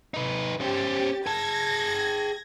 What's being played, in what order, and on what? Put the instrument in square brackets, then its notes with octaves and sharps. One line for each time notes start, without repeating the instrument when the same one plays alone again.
[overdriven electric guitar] D#4 B4
[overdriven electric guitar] C#4 C5 [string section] G4 A6
[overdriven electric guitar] G#4 A5 [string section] G#6 A#6